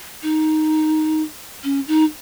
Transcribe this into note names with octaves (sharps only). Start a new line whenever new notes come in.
D#4
C#4
D#4